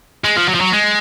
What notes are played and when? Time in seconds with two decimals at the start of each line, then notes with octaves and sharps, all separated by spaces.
0.24 G#3
0.36 F3
0.48 F#3
0.55 F3
0.61 F#3
0.73 G#3